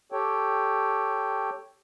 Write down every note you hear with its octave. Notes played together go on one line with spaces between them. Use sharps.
G4 A4 C#5 G5